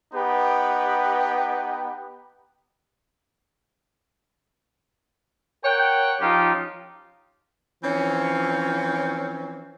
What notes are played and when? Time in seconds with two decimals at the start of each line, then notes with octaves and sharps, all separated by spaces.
0.13 B3 D#4 G4 B4 G5
5.64 A#4 C#5 F#5 G5
6.21 F3 C#4 D#4 F4 G4
7.84 E3 F3 C4 C#4